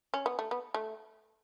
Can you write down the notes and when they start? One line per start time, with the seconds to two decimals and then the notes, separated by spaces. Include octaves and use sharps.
0.14 C#4
0.26 B3
0.39 A3
0.51 B3
0.74 A3